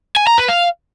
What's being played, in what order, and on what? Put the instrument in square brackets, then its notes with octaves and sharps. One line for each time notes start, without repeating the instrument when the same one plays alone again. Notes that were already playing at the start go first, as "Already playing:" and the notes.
[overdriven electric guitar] G#5
A#5
B4
F5